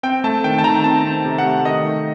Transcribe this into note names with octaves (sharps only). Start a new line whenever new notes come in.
C4 G5
A3 A5
D#3 G5
A5
D#3 A#5
C4 A5
C4
C3
F#5
A3
D#3 D#5
A3